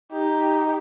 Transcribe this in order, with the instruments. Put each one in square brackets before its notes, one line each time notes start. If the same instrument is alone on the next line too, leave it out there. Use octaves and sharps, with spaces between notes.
[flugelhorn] D#4 [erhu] G4